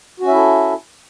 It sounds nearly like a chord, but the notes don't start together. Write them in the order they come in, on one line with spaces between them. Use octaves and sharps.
F#4 C#4 E5 E4 A4